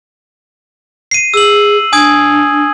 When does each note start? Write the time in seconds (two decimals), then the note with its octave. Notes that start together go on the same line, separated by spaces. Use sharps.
1.11 C7 D#7
1.34 G#4 E6 F#7
1.93 D4 G#5 D#6 G#6